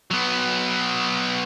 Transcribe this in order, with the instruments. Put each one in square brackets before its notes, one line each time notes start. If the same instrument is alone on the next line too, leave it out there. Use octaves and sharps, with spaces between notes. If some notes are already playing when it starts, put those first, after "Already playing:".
[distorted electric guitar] F#3 B3